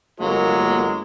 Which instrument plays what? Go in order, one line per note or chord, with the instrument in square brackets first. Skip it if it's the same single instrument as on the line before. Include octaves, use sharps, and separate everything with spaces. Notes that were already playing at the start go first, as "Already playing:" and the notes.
[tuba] G1 [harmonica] F#3 [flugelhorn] G#3 [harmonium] A#3